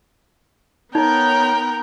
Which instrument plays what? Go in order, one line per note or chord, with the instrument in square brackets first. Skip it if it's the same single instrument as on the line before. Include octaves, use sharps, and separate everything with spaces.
[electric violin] B3 G5 [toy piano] D#4 [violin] A#4 [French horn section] C#5